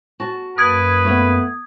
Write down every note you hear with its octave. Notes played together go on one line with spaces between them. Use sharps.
F#4 A5
F#2 A#3 B4 D#6 G#6
A3 B3